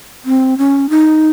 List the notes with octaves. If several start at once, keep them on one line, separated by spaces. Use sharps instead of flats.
C4
C#4
D#4